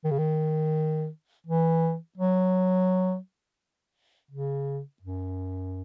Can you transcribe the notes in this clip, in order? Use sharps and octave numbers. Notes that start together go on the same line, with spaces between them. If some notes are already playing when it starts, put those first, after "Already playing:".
D#3
C#3
D#3
E3
F#3
C#3
F#2